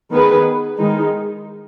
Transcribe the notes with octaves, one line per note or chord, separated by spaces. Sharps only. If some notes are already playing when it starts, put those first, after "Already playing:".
D#3 B3 G#4 B4
D#3 G#3 D#4